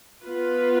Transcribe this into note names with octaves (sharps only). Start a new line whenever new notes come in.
B3 F4 B4